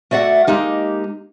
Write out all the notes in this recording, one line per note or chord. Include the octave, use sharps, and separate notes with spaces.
A3 F#4 D5 E5 F#5
G#3 A#3 D#4 G4